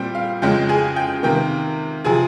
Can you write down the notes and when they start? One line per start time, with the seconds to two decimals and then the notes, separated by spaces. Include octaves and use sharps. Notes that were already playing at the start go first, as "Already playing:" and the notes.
Already playing: A#2 G3 C4 G5
0.15 F5
0.42 F2 C#3 G#3 C#4 G5
0.69 G#4 G#5
0.96 G5
1.23 C3 D#3 A#3 G5
2.04 C3 F3 C4 G#4 G#5